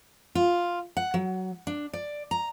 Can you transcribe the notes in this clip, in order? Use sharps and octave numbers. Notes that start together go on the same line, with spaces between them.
F4
F#5
F#3
D4
D5
A#5